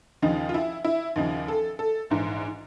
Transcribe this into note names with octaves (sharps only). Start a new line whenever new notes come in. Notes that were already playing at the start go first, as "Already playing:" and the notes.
D#2 C#3 F3 D#4
F4
E4
E4
D#2 C#3 F3 D#4
A4
A4
A#1 G#2 E3